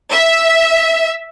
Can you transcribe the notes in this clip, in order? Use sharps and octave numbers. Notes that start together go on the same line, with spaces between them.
E5